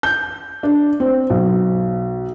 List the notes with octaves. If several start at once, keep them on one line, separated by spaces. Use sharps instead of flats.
G6
D4
C4
B1